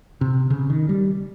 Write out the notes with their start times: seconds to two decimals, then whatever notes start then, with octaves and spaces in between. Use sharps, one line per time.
0.21 C3
0.50 C#3
0.70 D#3
0.89 G3